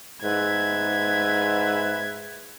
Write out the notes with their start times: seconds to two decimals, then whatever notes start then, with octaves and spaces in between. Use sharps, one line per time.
0.24 G#2 B4 E5 G#6